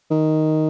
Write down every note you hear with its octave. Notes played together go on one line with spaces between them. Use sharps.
D#3